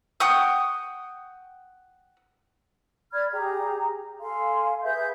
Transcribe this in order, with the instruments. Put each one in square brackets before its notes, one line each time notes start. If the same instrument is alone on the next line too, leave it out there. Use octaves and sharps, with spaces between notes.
[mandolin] F#5 G5 C#6 D#6
[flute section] D5 B5 F6 G#6
G4 G#4 A#5
A4 F5 G#5 C6
G#4 B4 E5 G6